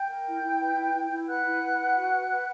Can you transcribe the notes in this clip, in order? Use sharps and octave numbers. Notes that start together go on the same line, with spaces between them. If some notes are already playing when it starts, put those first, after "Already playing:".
Already playing: G5 G6
A#4
E4
E4
B4
E4
E4
E4
B4 F#5 F#6
E4
B4
B4
F#4
B4
B4